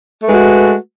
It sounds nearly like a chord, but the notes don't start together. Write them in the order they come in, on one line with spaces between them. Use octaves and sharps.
A3 B4 G#3 F#4